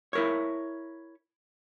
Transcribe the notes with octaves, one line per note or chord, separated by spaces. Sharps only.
E4 A#4 C#5